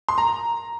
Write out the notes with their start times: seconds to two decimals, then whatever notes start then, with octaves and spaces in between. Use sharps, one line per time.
0.09 C6
0.18 A#5